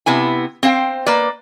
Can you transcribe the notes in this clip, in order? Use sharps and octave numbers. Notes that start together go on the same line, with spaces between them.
C3 B3 E4 G#5
C4 C5 F5 G5
A#3 B4 D5